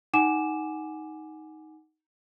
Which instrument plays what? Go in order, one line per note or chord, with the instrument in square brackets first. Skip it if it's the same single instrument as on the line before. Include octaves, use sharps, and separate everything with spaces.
[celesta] D#4 F#5 G#5 D6 E7